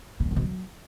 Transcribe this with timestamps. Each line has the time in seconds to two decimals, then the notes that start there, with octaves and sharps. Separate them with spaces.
0.20 B2
0.25 F#2
0.31 D3
0.36 B2
0.42 F#3